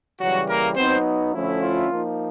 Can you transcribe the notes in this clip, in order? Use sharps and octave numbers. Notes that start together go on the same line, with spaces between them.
C#3 E3 F#3 G3 F#4
A#3 A#4
F#3 B3 C4 D#4 C5
D3 F3 A3 C#4 E4
F4
F3 A#3 D#4